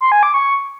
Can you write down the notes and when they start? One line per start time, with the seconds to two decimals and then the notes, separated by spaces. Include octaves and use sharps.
0.01 C6
0.12 G#5
0.23 D6
0.34 C#6